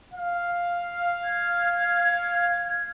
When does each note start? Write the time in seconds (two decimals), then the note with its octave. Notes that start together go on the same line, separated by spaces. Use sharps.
0.14 F5
1.24 G#6